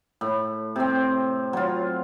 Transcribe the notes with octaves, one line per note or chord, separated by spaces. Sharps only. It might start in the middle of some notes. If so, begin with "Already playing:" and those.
A2
C3 C4
F#3 F4